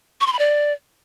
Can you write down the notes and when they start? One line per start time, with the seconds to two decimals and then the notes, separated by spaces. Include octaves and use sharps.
0.21 C#6
0.27 C6
0.33 B5
0.39 D5